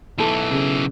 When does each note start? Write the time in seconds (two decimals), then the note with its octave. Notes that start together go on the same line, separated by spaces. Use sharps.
0.18 B1 E3 E4 A4
0.51 C#3